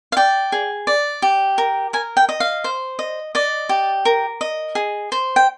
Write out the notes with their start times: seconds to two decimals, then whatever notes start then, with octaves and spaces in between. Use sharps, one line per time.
0.12 F5
0.17 D5 G5
0.52 G#4
0.87 D5
1.22 G4
1.58 A#4
1.93 A#4 G#5
2.17 G5
2.29 D#5
2.40 F5
2.64 C5
2.99 D#5
3.35 D5 D#5
3.69 G4
4.05 A#4
4.41 D#5
4.75 G#4
5.12 C5
5.36 G5